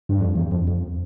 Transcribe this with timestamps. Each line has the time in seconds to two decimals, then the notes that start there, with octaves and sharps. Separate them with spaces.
0.09 G2
0.20 F2
0.36 E2
0.52 F2
0.67 F2